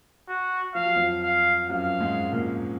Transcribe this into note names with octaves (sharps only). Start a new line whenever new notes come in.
F#4
F3 F5
F#3
F2 F3
F5
F#2 F#3 F5
G#2 G#3
A#2 A#3